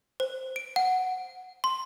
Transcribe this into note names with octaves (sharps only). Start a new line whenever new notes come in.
C5
D7
F#5
C6